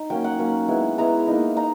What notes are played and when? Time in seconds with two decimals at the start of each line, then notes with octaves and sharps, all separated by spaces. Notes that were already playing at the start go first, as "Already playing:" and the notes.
Already playing: D#4
0.10 F#3 A#3 C#4 G5
0.24 F#5
0.39 F#3 A#3 C#4
0.68 G#3 B3 E4
0.98 G#3 B3 E4 A#5
1.27 A#3 D#4
1.56 D#4 A#5